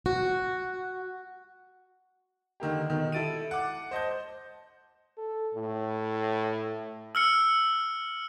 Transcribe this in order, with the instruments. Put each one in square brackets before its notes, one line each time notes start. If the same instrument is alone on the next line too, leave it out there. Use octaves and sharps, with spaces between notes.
[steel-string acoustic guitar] F#4
[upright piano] D3 D#3 A#3 G4
B2 D#3
E4 A4 A6 D7 D#7
F#5 D6
C5 D#5 A5 G6
[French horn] A4
A2
[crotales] E6 F6 C#7